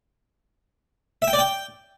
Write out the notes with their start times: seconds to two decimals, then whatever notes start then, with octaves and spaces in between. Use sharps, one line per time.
1.22 E5
1.28 G5
1.33 D5
1.39 G5